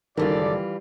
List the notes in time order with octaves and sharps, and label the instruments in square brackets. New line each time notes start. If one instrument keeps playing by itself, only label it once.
[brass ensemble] F#1 A4 D5 [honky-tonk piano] D#3 [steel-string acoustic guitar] E3 G3 F4